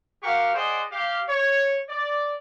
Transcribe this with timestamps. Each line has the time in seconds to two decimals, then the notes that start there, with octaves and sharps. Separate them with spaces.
0.23 F#4 G4 A#4 F5 F#5 C#6
0.55 G#4 C5 D5 D#5 F#5 G5
0.92 G4 F5
1.29 C#5
1.89 D5